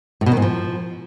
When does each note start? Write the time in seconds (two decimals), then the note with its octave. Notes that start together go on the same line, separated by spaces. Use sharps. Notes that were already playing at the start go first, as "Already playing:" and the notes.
0.21 A2
0.26 B2
0.32 D#3
0.37 G#2
0.42 F3